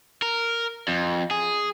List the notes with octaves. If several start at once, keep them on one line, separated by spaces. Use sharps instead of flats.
A#4
F2
G#4